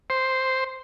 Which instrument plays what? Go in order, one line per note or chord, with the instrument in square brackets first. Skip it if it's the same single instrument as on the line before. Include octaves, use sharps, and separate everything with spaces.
[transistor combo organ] C5